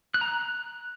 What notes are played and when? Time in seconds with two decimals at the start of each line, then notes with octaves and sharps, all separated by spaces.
0.14 F#6
0.21 A#5
0.28 F#6